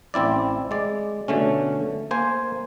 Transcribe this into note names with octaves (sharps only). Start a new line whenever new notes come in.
A1 C4 E4 D5
G#3 D5
B2 D3 A3 C#4
A#3 C5 G#5